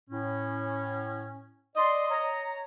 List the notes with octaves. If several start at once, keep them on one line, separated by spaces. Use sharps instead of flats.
A2 C#4
D5 D#5 C6
C#5 A#5